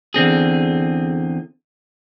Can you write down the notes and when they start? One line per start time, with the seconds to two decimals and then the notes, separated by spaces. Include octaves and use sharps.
0.14 E2 D3 C4 G#4